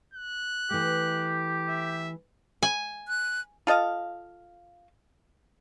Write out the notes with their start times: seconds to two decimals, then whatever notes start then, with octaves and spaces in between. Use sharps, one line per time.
0.14 F#6
0.71 E3 A3 G4
1.68 E5
2.63 G#5
3.08 F#6
3.67 F4 A4 D#5 F5